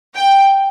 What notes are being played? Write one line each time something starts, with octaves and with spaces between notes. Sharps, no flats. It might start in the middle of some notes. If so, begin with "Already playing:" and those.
G5